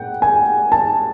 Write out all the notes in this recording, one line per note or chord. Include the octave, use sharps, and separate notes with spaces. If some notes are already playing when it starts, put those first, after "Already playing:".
Already playing: F#5 G5
G#5
A5